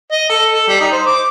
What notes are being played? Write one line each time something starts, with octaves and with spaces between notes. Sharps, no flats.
D#5
A4
A4
G3
D#4
C5
D6